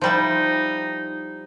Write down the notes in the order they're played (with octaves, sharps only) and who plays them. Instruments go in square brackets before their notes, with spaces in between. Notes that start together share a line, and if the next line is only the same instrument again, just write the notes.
[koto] F3 G3 E4 [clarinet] D#4